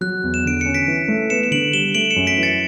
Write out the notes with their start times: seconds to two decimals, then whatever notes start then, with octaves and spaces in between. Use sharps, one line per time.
0.01 F#3 F#6
0.23 E2
0.34 E7
0.45 D3 D7
0.61 C#4 C#7
0.74 B6 D7
0.87 E3
1.08 A3
1.30 B3 C#7 E7
1.43 E7
1.51 D3 D7 F#7
1.73 G3 E7 G7
1.94 A3 D7 F#7
2.11 C#7 E7
2.16 F#2
2.27 B6 D7
2.37 E3
2.43 A6 C#7